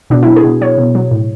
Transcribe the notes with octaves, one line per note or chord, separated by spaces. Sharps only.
B2 D4
F#3 E4
G#4
B2
F#3 C#5
B2
F#3
A2